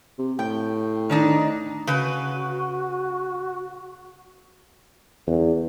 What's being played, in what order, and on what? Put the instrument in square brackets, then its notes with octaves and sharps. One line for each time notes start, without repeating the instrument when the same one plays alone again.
[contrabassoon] C3
[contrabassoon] A2 [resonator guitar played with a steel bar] G5
[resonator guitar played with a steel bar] D#3 D4 D#4
[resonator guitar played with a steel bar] C#3 B4 [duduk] F#4
[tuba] E2